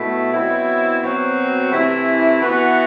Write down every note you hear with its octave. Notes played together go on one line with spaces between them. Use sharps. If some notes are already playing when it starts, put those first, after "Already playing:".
Already playing: B2 A3 E4
B2 F#3 C4 E4
B2 F#3 C4 F#4
C3 E3 A3 E4
E3 B3 F#4